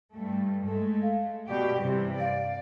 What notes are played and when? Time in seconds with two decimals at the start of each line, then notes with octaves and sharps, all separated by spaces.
0.16 G2 A3
0.66 G#3 A3 A4
1.02 F5
1.50 B2 G4 D5
1.80 G2 C3 E3 G4
2.20 D5 F5